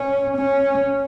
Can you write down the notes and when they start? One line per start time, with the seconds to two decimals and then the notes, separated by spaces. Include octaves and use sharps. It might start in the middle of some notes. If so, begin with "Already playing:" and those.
Already playing: C#4
0.37 C#4